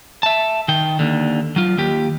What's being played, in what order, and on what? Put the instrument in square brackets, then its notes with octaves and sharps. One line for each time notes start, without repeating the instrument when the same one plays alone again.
[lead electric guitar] E5 A5
D#3 G5
D#2 D3
F#3 F4
D#2 G4